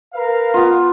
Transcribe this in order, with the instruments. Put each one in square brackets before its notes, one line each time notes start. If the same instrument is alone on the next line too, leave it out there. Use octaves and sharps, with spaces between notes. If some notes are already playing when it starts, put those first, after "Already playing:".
[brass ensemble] A#4 B4 F5
[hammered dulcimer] B3 F4